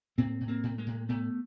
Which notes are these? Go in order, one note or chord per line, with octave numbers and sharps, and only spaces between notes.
A2 A#3 C4
A2
A#3 C4
A2
G#3 A#3
A2
A2 A3 B3